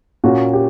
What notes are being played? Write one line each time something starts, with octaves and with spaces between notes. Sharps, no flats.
A#2 A#3 C#4 F#4
G4